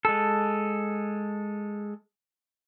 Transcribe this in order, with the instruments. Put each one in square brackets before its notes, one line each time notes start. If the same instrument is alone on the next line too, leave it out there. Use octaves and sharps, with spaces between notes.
[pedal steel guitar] G#3 A4